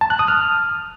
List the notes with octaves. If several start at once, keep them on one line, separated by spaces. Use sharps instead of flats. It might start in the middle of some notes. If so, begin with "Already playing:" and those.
A5
F#6
D#6
F6